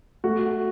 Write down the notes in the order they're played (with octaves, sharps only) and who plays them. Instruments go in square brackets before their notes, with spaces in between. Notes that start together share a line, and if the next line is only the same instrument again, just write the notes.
[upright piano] A3 [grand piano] F#4